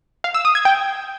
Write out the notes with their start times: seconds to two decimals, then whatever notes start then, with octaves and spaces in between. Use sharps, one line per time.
0.24 F5
0.34 E6
0.45 D#6
0.55 G#6
0.65 G5